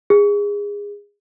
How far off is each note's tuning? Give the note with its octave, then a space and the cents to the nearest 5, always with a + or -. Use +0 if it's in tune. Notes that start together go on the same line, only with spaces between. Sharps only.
G#4 -25